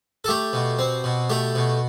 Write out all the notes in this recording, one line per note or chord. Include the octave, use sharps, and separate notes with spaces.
A4
A3 G4
B2
C4
B2
A3 G4
B2